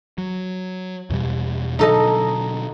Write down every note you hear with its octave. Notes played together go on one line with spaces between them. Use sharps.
F#3
E2 B2 G3
B2 D3 F#3 D#4 A4 D#5